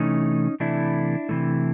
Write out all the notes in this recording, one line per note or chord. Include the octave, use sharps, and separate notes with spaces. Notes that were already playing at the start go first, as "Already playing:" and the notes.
Already playing: C3 E3 A3 C#4 D#4
C3 E3 A3 D4 E4
C3 E3 A3